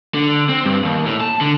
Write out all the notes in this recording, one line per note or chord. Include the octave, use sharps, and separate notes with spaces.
D3
C4
G2
D#2
A2
A5
D3